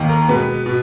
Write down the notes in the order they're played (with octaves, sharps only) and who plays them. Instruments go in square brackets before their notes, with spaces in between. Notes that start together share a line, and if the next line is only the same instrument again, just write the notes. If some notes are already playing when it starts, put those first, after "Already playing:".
Already playing: [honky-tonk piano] D#2 D#3 A#3
A#4
B2 G#3 B3 B4
B2